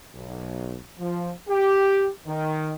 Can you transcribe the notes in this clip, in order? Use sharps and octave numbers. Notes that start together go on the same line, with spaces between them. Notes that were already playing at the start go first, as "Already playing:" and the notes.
B1
F3
G4
D#3